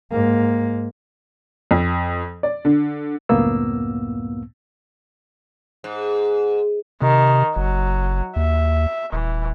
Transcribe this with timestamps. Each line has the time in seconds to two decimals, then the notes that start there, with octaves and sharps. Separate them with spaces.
0.11 G#2 A#3
1.71 F2
2.43 D5
2.65 D3
3.29 C#2 F#2 A2 A#3 B3 E6
5.84 G#2
7.02 C3 D#3
7.56 F#1 F#3
8.36 D#2 E5
9.13 D#1 E3